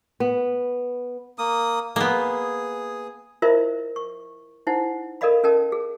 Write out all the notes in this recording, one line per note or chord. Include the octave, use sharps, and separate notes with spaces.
B3
A#3 D#6
A#3 B3 G#4
E4 F4 A#4 C5 D#5 E5
C#6
D#4 E4 C5 F#5
A4 A#4 D5 D#5 F5 B5
C#4 A4 A#4 D#5 G5 A5
G#4